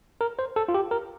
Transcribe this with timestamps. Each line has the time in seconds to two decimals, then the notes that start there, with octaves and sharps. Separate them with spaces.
0.21 A#4
0.39 C5
0.56 A4
0.69 F4
0.74 G4
0.91 A#4